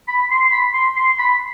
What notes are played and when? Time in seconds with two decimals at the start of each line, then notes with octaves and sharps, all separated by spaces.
0.08 B5
0.31 C6
0.52 B5
0.74 C6
0.96 C6
1.19 B5